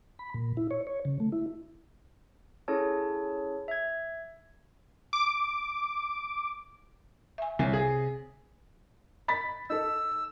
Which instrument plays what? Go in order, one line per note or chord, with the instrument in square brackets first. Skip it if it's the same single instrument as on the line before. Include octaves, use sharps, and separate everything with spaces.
[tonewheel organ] B5
A#2
E4
C#5
C#5
C#3
A3
E4
[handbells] C#4 E4 G#4 A4 C#5 A5
E5 G#6
[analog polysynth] D6
[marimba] E5 G#5
[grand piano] C2 [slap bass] C3 [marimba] C#5 E5 G#5
[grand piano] G#4
[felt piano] B5 A6 B6
[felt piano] D#4 A4 [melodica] E6